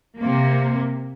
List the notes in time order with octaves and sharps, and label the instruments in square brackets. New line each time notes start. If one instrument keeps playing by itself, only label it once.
[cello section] C3 A#3